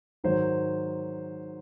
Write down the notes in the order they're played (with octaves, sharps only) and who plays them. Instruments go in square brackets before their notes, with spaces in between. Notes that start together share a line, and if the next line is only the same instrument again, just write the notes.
[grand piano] G#2 D#3 F#3 C5